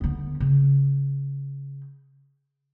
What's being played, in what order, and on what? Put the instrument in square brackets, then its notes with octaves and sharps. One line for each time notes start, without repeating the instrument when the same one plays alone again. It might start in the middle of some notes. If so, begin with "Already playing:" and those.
[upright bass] D3 B3
C#3